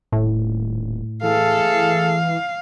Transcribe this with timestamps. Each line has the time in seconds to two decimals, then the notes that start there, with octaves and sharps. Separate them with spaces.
0.12 D#1 A2
1.23 E3 A3 G#4 A4 F5